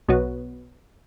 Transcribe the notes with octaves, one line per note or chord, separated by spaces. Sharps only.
B1 B2 F#3 B3